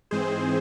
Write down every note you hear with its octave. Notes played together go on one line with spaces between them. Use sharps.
G#2 E3 G#3 C4 G#4 C5